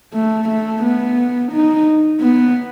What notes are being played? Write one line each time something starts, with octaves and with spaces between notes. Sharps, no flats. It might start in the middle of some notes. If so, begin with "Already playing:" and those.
A3
A3
B3
D#4
B3